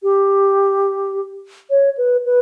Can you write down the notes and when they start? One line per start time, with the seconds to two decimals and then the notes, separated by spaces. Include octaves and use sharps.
0.03 G4
1.70 C#5
1.98 B4
2.25 B4